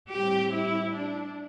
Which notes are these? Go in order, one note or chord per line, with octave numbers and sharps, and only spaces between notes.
A2 G3 C4 G4
E4
D4